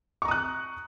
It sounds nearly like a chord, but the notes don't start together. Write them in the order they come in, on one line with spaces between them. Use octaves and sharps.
C#6 A#5 D#6 F#6